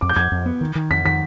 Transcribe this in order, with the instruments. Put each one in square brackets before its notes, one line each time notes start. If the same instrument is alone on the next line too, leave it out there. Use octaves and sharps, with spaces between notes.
[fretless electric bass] F2 [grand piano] D6
[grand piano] G6
[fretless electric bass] F2 [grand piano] G#6
[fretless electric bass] F2
B3
D#3
D#3
[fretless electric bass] F2 [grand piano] B6
[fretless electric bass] D#3 [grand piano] B6